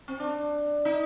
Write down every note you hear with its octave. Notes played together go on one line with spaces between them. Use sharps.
C4
D4
D#4